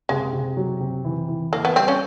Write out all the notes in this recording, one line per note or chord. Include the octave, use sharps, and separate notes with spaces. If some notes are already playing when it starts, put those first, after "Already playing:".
C3 G#3
C3
F#3
C3
E3
E3
E3 A#3
B3
G3 C4
C#4